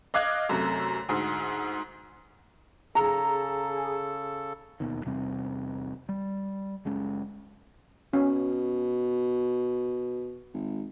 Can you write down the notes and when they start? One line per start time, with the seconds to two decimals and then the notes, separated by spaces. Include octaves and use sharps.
0.14 D#5 F5 D6 F#6 G#6
0.49 F#2 C3 A3
1.09 D2 G#2
2.95 C#3 G#4 A4 A#5
4.80 E1 D#2 B2 D#3
5.05 E2 C3 G3 C4
6.09 G3
6.85 F#1 G#3 C#4
8.13 B2 C#4
10.54 G#1